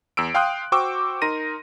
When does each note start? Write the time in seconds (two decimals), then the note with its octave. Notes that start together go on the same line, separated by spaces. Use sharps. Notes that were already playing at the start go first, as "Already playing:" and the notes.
0.17 E2 E6 D7
0.34 F5 G5 C6 D#6 F#6
0.72 F#4 C5 G5 C#6 D6 E6
1.22 D#4 A#4 C6 A#6 D#7